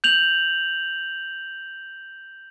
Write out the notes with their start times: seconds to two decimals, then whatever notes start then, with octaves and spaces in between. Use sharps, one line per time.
0.04 G6 F7 F#7